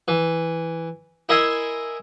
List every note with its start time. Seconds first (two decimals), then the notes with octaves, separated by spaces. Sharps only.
0.08 E3
1.29 E4 A#4 D#5 E5 G#5 C6